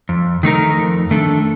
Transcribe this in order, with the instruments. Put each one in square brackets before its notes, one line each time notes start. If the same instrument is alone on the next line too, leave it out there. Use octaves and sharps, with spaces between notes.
[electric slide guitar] F2
D#3 A3 D#4 A#4
F2
D#3 A3 D4 A4